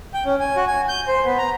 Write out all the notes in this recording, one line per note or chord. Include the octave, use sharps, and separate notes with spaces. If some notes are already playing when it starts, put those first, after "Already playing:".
G5
C#4
G#5
F#4
G#5
G6
C5
B3
A#5